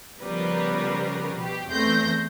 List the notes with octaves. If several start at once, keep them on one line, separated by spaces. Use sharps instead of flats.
C#3 F3 G3 B3 A#4 B4
B2 G4
E2 A3 C4 C6 G6 A#6